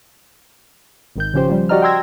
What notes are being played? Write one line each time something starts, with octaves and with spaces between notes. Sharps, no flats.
G#1 D#3 G6
C#3 F3 C#4 G4 C5
F3 G3
F#4 G4 D5 D#5 A#5 F6
G5 A#5 C6 E6 G#6 A#6